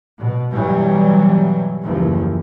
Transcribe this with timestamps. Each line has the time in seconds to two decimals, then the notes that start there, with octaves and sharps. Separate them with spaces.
0.19 B2
0.51 G2 B2 E3 F#3 G3
1.82 F#1 D#2 E3 F3